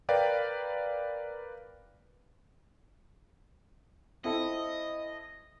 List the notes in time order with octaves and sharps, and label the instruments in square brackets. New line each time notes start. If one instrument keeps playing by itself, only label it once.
[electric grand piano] A#4 B4 D5 F5 G5
[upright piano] C4 E4 A4 [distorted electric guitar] D#5